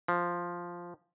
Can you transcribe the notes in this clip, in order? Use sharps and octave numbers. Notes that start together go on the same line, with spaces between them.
F3